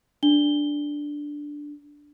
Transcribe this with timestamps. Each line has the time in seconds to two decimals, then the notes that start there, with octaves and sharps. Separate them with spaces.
0.23 D4 G7